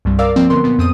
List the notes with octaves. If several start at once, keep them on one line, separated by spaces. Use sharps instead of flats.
C2 G2 G3
A#4 D5 F5 D6 E6
F3 A#3 C4
D3 F#3 B3 A#4 C6
A#2 B3
F2 C4 D#6 D#7